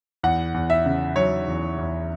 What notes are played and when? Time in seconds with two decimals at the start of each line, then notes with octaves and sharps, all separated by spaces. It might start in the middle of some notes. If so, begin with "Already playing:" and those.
0.23 E2 F#5
0.54 E2
0.70 E5
0.86 C#3
1.16 F#3 C#5
1.48 E2
1.78 E2